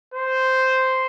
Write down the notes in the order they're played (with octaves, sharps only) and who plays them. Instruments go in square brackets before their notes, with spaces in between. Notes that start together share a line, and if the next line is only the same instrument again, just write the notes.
[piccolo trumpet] C5